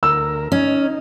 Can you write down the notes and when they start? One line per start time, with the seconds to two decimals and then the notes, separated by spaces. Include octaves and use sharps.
0.03 D2 A#4 E6
0.52 C#4 D#4